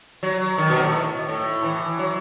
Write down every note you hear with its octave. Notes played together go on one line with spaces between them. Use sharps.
F#3
D#3
B2
A2
A2
E3
F#3